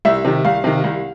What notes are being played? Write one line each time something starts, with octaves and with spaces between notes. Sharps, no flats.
C2 E5
C3 D#3
C2 F5
C3 D#3
C2